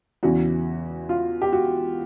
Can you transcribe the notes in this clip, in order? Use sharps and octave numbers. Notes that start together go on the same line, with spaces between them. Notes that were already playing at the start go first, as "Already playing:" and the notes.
E2 C#3 E3 F#4
F4
G4
F#4